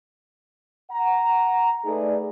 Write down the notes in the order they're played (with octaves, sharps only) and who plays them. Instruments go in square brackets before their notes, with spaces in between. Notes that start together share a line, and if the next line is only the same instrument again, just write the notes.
[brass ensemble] F#5 A#5
A3 D#4 G#4 A4 B4 D5